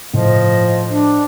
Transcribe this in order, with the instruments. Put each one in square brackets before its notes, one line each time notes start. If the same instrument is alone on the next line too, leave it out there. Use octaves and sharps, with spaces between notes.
[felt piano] A2 [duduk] F3 [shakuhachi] D#5
[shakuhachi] D4